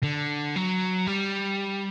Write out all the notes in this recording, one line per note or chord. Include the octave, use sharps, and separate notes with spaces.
D3
F#3
G3